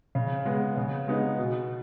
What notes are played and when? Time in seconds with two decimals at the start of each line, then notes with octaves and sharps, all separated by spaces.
0.15 C#3
0.45 G#3 B3
0.77 C#3
1.07 G#3 B3 D#4
1.38 B2